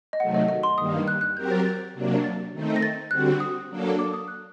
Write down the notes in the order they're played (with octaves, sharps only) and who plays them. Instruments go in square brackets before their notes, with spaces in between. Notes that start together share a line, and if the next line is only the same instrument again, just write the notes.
[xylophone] D#5
[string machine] C3 D#3 F#3 A3 [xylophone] F#5
[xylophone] D#5
D#5
C6
[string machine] G2 D#3 G3 A#3 [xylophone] D#6
[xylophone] F#6
F#6
[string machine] F#3 C4 G4 A#4 [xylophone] G6
[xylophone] A6
A6
[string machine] C3 F#3 A#3 D4
[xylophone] A6
[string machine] D#3 A3 C4 D#4
[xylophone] A#6
A6
[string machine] D3 G3 C4 F#4 [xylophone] F#6
[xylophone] D#6
[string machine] F#3 A#3 D4 A4
[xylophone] D6
D#6
F#6